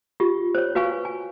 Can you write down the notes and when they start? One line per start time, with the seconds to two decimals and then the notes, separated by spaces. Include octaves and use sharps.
0.20 F4 G4
0.55 C5 C#5
0.75 F#4 B4 F5 G#5 C#6
1.05 G#5